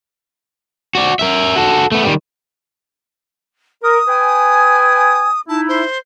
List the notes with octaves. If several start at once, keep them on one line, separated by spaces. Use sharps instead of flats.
F#4 D5
A#4 E5
F#4 A4
A3 B3
D#3 G3
A#4 D#6
B4 G5 G#5
D#4 E4 A5
C5